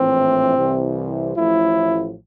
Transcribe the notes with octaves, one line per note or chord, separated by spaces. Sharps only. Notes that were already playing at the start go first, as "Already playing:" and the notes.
Already playing: A#1 A2 E3 C4
C2 C3 E3
A1 A2 F3 E4